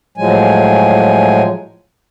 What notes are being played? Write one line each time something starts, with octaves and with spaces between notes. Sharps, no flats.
A2 F3 F#3 G#3 G#5